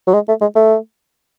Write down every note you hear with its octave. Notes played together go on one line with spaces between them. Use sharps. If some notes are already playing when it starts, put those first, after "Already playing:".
F#3
G#3
A3
G#3
A3